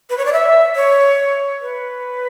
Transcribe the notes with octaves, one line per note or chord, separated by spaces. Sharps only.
B4
C#5
D5
E5
C#5
B4